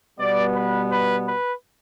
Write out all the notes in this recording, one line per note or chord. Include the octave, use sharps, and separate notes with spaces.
B2 G3 B3 D5
B4
B4
B4